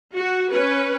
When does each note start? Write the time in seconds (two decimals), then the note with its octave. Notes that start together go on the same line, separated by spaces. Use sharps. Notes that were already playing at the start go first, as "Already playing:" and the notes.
0.15 F#4
0.51 C#4 B4